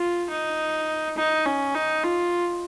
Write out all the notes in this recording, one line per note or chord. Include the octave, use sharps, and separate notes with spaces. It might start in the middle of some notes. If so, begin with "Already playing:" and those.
Already playing: F4
D#4
D#4
C#4
D#4
F4